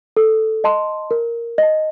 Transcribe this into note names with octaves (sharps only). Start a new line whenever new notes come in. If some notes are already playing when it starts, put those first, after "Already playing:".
A4
D#5 A5 C6
A#4
D#5 A5